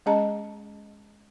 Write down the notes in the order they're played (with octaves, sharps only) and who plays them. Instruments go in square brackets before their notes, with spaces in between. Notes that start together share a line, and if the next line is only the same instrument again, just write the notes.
[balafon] G#3 C#4 G#4 D#5 A5 A#5